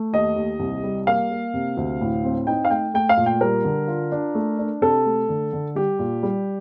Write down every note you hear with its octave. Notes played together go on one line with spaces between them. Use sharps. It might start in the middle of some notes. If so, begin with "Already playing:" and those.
Already playing: A3
D#2 D#5
D#2
C2
G3
A#3 F5
A#3
C3
D2
A2
C4
D#4 G5
F5
A3 G5
A3 G5
F5
A#2
G5
G3 A#4
D3
F4
D4
A3
D4
C3 A4
A3
D3
D3
G3 G4
A#2
G3